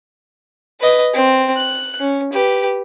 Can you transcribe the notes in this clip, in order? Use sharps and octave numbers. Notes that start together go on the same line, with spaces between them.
B4 D#5
C4
F#6
C#4
G4 B4